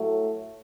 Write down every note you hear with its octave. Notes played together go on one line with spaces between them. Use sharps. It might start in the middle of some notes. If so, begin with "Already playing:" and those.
Already playing: A2 F#3 A3